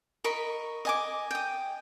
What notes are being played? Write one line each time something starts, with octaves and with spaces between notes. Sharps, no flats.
A#4 D#5 B5 C#6
D#5 G#5 D6
G5 D#6